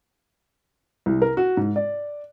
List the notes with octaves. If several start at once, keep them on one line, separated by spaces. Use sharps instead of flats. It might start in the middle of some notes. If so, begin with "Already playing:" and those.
C2
A#4
F#4
G#2
D5